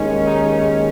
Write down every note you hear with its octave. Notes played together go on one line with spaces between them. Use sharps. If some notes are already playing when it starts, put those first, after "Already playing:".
Already playing: D#2 D#3 G#3 C#4
D#4